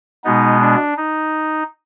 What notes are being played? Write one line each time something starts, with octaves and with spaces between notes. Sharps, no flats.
B2 G#3 B3 D#4
D4
D#4